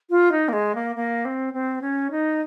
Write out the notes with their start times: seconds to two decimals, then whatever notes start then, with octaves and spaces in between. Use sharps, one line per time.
0.10 F4
0.32 D#4
0.49 A#3
0.53 G#3
0.75 A#3
0.96 A#3
1.25 C4
1.53 C4
1.82 C#4
2.11 D#4